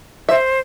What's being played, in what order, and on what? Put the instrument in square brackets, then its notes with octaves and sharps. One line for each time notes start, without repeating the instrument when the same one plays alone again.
[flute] C5 [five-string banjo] E5